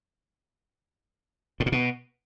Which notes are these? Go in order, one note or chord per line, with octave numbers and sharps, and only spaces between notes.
A2
A#2
B2